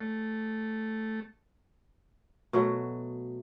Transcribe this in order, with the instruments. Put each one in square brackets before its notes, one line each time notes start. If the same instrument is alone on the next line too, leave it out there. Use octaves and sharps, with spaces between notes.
[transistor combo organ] A3
[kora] B2 F#3 A3